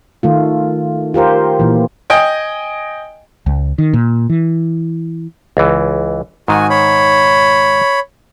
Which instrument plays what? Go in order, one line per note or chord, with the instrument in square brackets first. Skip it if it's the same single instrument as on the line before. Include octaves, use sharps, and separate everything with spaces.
[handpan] D#3 A3 F4
F4 G4 A#4 C5
A#2 E3
[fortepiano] D#5 G5 G#5
[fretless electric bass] C#2
D#3
A#2
E3
[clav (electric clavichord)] C#2 E3
[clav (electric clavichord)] G#2 D#3 [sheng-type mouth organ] F#4 G#5
[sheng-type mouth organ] C#5 B5